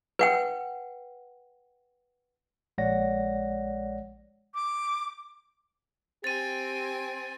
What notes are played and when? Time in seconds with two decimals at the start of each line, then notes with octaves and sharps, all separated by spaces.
0.19 B4 F#5 G5
2.78 A#1 G#3 C#5 D5 F#5 A#6
4.55 D6
6.24 C4 G4 G#5 A6 D#7